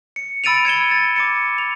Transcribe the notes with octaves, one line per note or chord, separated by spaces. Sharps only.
C#7
B5 E6 A6 D7 D#7 F7
G#6 C#7 E7 G7
A6
D6 A6 C#7
F7